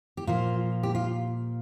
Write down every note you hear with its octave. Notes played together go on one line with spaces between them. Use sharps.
G4
A#2 F3 F4
G4
F4